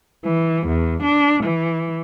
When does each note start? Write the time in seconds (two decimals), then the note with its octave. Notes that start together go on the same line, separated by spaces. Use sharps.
0.24 E3
0.67 E2
1.02 D4
1.43 E3